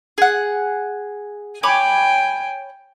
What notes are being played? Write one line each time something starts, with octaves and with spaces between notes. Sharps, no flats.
G#4 F#5
C#5 G5 G#5 B5 D6